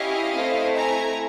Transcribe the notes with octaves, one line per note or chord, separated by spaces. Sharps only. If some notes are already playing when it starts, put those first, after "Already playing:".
Already playing: C#4 E4 G4 D#5 F5
A3 C4 E4
G#5 A#5